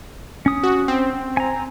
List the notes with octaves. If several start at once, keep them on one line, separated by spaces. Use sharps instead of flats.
C#4 D#6
F#4
C4
G#5 A#5